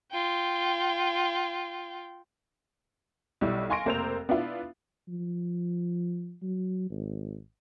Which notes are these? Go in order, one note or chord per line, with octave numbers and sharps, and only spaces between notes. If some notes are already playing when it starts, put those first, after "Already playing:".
F4 G5
B1 G3 E4 E6
F5 G#5 C6 C#6 A#6 D7
F1 A#3 A#4 C5 E6 F7
B3 D4 E4 F4
F3
F#3
G#1